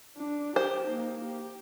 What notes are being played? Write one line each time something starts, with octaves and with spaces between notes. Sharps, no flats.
D4
G4 C5
A#3 D#4
G4